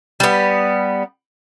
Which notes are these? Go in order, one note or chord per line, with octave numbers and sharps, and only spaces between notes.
G3 B3